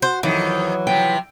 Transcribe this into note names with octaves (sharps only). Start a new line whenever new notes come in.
F#4 C5
F2 D#3 E3 F#3
C3 F3 G5